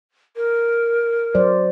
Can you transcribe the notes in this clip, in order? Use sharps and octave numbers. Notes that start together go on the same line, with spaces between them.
A#4
F#3 C5 D5